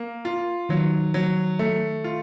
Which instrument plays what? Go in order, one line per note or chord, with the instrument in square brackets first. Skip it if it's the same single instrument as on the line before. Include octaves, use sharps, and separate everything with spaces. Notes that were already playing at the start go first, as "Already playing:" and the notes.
Already playing: [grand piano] A#3
F4
[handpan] D#3 [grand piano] F#3
[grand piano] F#3
A3
F4